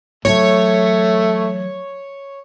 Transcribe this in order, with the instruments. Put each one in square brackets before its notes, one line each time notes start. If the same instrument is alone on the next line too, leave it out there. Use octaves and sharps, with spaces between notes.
[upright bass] E3 F#3 [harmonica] A3 [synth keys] C#5